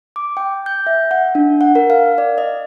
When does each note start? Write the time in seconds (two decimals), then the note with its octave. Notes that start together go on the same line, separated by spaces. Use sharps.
0.16 D6
0.37 G5
0.66 G6
0.87 E5
1.11 F#5
1.35 D4
1.61 F#5
1.75 A#4
1.90 F5
2.18 D5
2.38 D#5